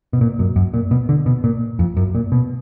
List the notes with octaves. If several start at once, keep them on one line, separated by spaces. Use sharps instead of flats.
B2
A#2
F#2
F#2
A#2
B2
D3
B2
A#2
F2
F#2
A#2
B2